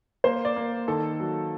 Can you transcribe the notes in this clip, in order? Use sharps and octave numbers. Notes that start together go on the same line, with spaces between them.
A#3 C5
D5
A#3
D#3 A4
F#3